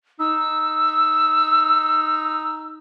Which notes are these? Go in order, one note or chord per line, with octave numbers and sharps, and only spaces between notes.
D#4 E6